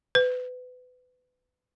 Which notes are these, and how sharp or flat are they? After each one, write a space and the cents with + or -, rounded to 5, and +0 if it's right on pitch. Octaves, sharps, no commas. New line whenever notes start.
B4 +25